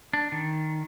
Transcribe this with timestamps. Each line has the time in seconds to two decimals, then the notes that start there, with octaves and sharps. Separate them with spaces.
0.13 D4
0.32 D#3